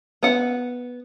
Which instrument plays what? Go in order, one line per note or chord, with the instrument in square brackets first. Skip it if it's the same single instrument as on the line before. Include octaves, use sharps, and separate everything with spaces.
[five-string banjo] B3 F#5